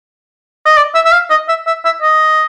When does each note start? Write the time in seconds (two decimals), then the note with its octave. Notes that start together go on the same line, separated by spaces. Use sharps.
0.65 D#5
0.77 D5
0.95 E5
1.05 E5
1.12 F5
1.30 D#5
1.49 E5
1.67 E5
1.85 E5
2.02 D#5